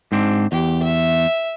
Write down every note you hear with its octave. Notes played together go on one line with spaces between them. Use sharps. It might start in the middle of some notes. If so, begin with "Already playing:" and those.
G#2 C4 D4
E2 G4
E5